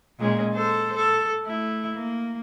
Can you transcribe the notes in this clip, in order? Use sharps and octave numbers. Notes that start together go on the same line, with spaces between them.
A#2 G#3 C#4
A4 C5
A4
A3 E4
A#3